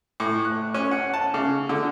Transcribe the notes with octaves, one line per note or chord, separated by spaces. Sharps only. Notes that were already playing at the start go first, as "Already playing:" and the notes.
A2
F#6
C#4
F#5
A5
C#3
D3